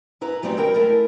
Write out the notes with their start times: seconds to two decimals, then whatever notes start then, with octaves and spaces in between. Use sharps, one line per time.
0.21 G#2 E4 B4 A#5
0.42 G#2 F#3 G3 A3 C4 D#4
0.57 D2 F#3 E4 A#4 G5 A#5
0.74 G#3 A3 E4 A4 A#4